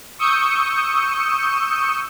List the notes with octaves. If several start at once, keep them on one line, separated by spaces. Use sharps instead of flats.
C#6 D#6 E6 G6 C#7